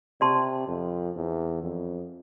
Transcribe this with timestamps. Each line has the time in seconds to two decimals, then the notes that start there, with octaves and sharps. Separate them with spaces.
0.21 C3 G4 D5 A5 C6
0.68 F2
1.16 E2
1.62 F2